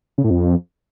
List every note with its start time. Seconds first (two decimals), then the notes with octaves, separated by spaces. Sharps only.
0.18 C#3
0.24 A2
0.30 F2